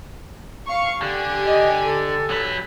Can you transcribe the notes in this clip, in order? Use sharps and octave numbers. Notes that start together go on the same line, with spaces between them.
F5 C#6
D3 G4 G#5
D#5
A4
F#3 B4